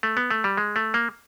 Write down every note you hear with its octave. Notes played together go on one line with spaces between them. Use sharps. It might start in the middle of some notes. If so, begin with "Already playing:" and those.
A3
B3
A3
G3
G#3
A3
A#3